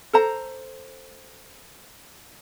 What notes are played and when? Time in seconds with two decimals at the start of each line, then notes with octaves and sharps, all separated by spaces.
0.13 A4 C5 A#5